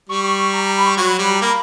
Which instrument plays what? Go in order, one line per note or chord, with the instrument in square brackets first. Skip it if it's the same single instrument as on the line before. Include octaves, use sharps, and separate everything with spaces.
[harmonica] G3 [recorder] C#6
[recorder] C#6
C#6
A#5
A#5
B5
C#6
[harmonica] F#3 [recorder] C#6
[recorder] B5
[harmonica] G3 [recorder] B5
[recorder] A#5
[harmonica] A#3 [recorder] B5